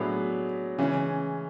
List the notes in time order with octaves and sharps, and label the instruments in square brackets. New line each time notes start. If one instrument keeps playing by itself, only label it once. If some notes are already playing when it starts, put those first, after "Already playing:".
Already playing: [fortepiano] A2 [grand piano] F#3 B3 D4 G#4 B4
[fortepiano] C#3 [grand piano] E3 G#3 C#4